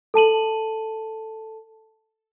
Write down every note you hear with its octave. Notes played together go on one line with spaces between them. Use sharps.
A4 A5 D#7 F#7